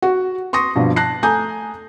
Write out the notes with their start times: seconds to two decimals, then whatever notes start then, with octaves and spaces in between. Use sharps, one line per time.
0.02 F#4
0.53 C6 C#6 D#6 A#6
0.76 G2 B2 F3
0.96 A5 F#6 A#6 C7
1.23 A3 G#5 A#5 D#6 G6